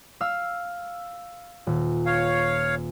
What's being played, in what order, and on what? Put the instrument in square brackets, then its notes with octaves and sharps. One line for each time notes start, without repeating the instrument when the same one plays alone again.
[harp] F5 E6
D#1
[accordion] C#5 F5